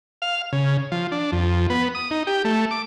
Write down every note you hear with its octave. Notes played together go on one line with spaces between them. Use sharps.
F5
C#3
F3
D4
F2
B3
D#6
D#4
G4
A3
D6